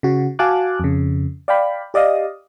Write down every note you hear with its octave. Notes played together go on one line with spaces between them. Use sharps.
C#3 F#4
F#4 F5 G#5 A5 D6 F#6
F2 C#3
D5 F5 G5 B5
G4 D5 D#5 F5 D#6